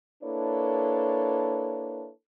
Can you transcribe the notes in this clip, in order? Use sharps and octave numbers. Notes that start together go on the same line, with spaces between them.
A#3 D4 E4 A4 B4 C#5